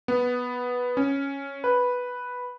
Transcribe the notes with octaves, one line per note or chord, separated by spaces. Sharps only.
B3
C#4
B4